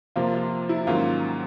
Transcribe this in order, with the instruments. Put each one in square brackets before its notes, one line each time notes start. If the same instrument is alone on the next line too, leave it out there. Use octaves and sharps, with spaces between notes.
[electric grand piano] C3 F3 A#3 [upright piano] F4
[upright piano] F4
E4
[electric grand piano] G#2 D#3 F#3 A#3 C#4 [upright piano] F4